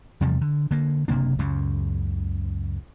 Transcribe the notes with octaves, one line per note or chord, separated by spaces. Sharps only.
E2 C3 F3 G3
D3
D3 A#3
F#1 C3 A#3 D4
C#2 F#2 C#3